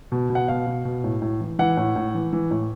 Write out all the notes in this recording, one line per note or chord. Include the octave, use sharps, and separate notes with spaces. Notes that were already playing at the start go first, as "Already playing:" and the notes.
B2
B2
F#5
B2 F5
B2
B2
A2
A2
E3
E3 F#5
A2
A2
E3
E3
A2